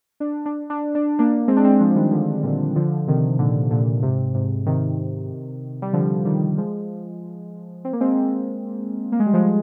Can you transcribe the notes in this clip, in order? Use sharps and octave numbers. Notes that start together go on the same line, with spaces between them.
D4
D4
D4
D4
A#3 D4
G#3 C4
D4
G#3 C4
F3 G#3
F3
D#3 G3
D3 F3
A#2 D3
D3 F3
C3 D#3
A#2 D3
A#2 D3
G#2 C3
G#2 C3
C3 D#3
G3
D3 F3
D#3 G3
F3 G#3
C4
A#3
G#3 C4
A#3
G#3
G3
F3 G#3